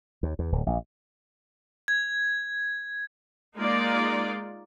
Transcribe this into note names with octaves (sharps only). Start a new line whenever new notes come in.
D#2
E2
D1
A#1
G#6
G#3 A#3 D#4 F4 A#4 D5